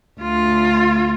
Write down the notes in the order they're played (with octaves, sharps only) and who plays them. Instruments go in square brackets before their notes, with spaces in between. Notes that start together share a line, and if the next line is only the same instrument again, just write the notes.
[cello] D2 F4